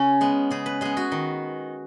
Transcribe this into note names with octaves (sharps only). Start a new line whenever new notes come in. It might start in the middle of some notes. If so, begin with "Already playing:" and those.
Already playing: C#3 C#4
G#3 B3
C#3 G#4
B4
G#3 B3 G#4
F#4
D#3